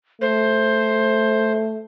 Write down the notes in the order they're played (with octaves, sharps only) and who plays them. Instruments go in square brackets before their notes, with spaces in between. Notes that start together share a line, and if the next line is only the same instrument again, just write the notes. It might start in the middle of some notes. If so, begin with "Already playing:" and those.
[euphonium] A3 [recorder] C5